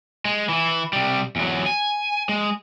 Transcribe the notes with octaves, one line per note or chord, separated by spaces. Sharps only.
G#3
E3 E4
C3 G3
E2 F#3
G#5
G#3